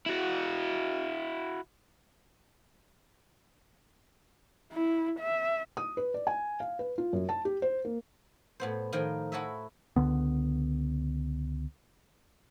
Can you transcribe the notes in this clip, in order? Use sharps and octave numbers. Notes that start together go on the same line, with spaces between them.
E4 F#4
E4
E5
D#6
B4
D5
G#5
F5
B4
F4
F#2
A5
G4
C5
A#3
A2 B3 C5
A2 D#3 F3 D#4 A#4 G5
E4 F#4 A4 C#5 D#5 E5
C#2 D3 B3